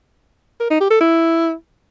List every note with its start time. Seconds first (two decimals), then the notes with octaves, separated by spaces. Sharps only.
0.60 A#4
0.70 D#4
0.81 G4
0.91 A4
1.01 E4